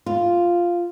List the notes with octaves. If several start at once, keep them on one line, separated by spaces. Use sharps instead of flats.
F4